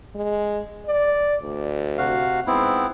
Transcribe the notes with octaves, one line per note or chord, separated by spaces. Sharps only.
G#3
D5
D2
C3 F#4 F5
G#2 B3 C4 E4